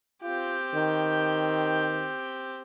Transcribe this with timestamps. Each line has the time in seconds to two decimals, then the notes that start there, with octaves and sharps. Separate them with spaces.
0.23 C4 F4 G4
0.74 D#3